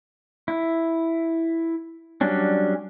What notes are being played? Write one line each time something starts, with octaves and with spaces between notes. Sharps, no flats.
E4
F#3 G3 C#4 D4